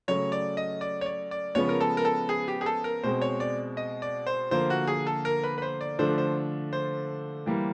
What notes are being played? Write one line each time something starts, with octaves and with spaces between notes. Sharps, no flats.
C#3 F#3 A3 C#5
D5
D#5
D5
C#5
D5
D5
C#3 F3 G#3 B3 C#5
A#4
A4
A#4
A4
G#4
G4
G#4
A4
A#4
B2 G#3 C4 C5
C#5
D5
D#5
D5
C5
D3 F3 A#3 C5
F#4
G#4
A4
A#4
B4
B4
C5
D5
D3 F3 A3 D4 C5
C5
C5
E3 G3 A#3